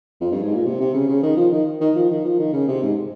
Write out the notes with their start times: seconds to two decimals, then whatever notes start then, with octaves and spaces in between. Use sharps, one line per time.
0.21 F2
0.32 G2
0.43 G#2
0.54 A#2
0.65 C3
0.80 C3
0.94 C#3
1.08 C#3
1.23 D#3
1.37 F3
1.52 D#3
1.81 D#3
1.95 F3
2.10 D#3
2.25 F3
2.39 D#3
2.53 C#3
2.68 C3
2.82 G#2